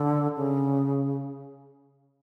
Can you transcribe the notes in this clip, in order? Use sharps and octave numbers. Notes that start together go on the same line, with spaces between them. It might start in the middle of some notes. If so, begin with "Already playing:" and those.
Already playing: D3
C#3